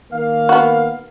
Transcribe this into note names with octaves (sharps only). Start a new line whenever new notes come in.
D#3 A#3 F5
B3 F#4